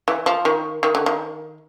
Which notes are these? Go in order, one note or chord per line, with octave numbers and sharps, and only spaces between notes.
E3
F3
D#3
D#3
D3
D#3